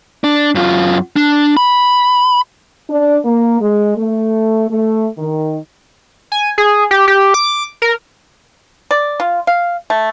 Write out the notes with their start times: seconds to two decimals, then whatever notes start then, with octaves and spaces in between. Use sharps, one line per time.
0.24 D4
0.55 F#2 F4
1.16 D4
1.57 B5
2.90 D4
3.25 A#3
3.61 G#3
3.97 A3
4.70 A3
5.18 D#3
6.32 G#5
6.58 G#4
6.91 G4
7.08 G4
7.34 D6
7.82 A#4
8.91 D5
9.20 F4
9.47 F5
9.90 A3